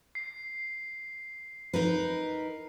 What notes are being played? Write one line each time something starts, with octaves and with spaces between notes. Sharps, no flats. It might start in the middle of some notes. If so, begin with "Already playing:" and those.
C7
D#4 A#4 B4